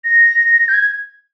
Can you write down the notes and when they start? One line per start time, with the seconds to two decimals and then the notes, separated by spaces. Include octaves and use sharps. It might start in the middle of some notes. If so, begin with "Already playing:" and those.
0.04 A#6
0.68 G6
0.74 G#6